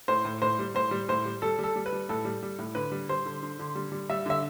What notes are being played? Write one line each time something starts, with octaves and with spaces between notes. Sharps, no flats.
A2 C5
A2
A2 C5
G3
A2 C5
G3
A2 C5
G3
G3 A4
G3 A4
G3
B4
G3
A2 A4
G3
G3
A2
D3 B4
G3
G3 C5
D3
D3
D3
G3
G3
G3 E5
D3 E5